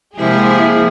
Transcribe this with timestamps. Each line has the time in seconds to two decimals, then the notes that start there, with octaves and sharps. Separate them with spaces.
0.17 C3 F3 G#3 A#3 E4 G4 G#4